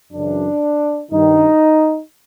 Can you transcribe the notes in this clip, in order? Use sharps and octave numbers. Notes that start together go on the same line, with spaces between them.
F#2 C#3 E3 D4
G2 D#3 D#4